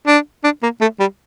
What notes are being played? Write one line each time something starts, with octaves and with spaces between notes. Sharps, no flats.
D4
D4
A#3
A3
G3